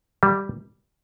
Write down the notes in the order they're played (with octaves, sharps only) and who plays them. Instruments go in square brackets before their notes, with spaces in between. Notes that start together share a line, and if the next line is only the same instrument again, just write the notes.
[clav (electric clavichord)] G3